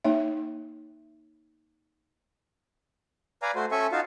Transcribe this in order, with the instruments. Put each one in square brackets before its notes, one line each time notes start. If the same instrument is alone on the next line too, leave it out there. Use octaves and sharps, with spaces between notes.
[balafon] A#3 D#4 C#5 E5
[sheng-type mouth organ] B4 D5 F5 G#5 A#5
A3 F#4 C5
C#4 A4 E5 G#5 C#6
D#4 F4 F#4 F5 A5